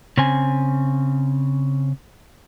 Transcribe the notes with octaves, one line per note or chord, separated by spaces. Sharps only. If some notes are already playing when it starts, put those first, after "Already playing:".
C#3 C4 G#5